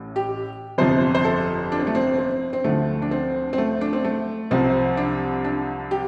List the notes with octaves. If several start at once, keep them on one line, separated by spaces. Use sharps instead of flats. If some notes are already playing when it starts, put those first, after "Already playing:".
Already playing: A1 A2
G4
G1 F2 C3 F3 C5
C5
A4
D4
C4
A3
C4
C4
C4
D2 D3 F3 A3
D4
C4
C4
A3
D4
C4
A3
C2 C3 F3 C4
D4
D4
G4